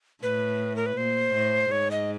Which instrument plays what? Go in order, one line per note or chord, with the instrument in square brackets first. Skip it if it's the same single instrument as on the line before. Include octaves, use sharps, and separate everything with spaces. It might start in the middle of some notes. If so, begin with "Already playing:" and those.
[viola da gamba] A2 [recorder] B4
[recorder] A#4
B4
[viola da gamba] A#2 [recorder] C5
[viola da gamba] A2
[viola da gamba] G#2 [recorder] C#5
[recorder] D#5